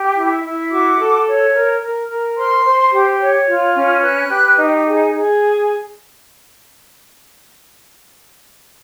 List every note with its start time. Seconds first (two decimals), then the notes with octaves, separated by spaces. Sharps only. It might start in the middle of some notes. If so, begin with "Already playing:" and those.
Already playing: G4
0.17 E4
0.44 E4
0.71 F#4 D6
0.99 A4
1.27 C#5
1.55 A#4
1.82 A#4
2.10 A#4
2.37 C5 C6
2.65 C5
2.92 G4
3.20 C#5
3.48 F4
3.75 C#4
4.03 B4 F#6
4.31 G4
4.57 D#4
4.86 G#4
5.13 G#4